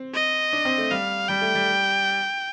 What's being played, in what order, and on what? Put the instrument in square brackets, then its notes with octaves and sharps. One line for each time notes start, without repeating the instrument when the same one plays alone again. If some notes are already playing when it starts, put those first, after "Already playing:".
Already playing: [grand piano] C4
[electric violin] D#5
[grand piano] D4
C4
A3
[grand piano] G3 [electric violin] F5
[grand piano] G3 [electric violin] G5
[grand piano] A3
G3